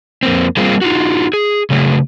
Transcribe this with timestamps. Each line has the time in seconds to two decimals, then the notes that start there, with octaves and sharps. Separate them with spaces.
0.23 F2 A#3 C4
0.57 G3 A#3 C4 F4 G#4
0.81 D#4 F4 F#4
1.33 G#4
1.70 C#3 F#3 A3 G4 G#4